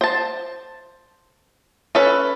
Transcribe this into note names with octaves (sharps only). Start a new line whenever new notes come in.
C5 A5
C#4 A4 B4